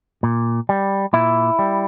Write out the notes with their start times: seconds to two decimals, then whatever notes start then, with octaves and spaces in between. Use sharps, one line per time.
0.23 A#2
0.69 G3
1.13 A#2 E4
1.59 G3